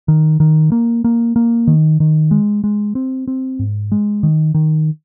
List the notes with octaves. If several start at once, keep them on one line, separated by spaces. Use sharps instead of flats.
D#3
D#3
A#3
A#3
A#3
D#3
D#3
G#3
G#3
C4
C4
G#2
G#3
D#3
D#3